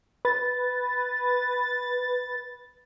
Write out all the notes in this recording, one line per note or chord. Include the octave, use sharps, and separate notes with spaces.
B4 A6